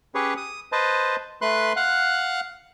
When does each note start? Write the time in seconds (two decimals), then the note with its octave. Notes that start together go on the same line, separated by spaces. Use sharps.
0.15 C#4 G4 G#4 B4 C#5
0.37 D#6
0.72 B4 C5 D#5 A5
1.42 A3 B4 C6 F#6
1.77 F5 F#5 F#6